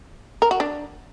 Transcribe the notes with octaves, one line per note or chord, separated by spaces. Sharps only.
A#4
F#4
D4